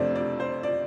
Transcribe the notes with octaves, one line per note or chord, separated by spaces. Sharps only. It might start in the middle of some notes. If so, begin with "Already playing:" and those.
Already playing: F2 C3 A3 D4 C5 D5
D5
C5
D5